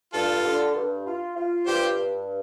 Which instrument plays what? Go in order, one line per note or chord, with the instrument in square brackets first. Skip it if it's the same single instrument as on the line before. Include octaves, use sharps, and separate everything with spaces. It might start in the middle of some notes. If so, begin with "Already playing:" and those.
[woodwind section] G2 [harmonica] F4 A4
[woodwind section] D3
G2
F4
F4
[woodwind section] G2 [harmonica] G4 C5
[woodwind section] G2